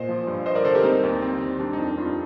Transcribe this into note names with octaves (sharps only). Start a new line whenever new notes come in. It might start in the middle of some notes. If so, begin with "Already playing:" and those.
Already playing: A#2 C5 D#5
F3
G2
G2 C5 D#5
A#4 D5
D3 A4 C5
G4 A#4
G3 C4 D#4
D#2
D#2 C4
D#3
G3 D4
D#4
F2 D4
F2 D4 F4